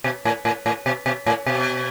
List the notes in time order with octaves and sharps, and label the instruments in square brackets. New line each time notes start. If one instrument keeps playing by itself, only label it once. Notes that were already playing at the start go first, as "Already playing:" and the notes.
[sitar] B2
A2
A2
A2
B2
B2
A2
B2